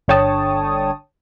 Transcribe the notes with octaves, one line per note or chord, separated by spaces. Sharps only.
G1 D3 C#5 G5 A5 D#6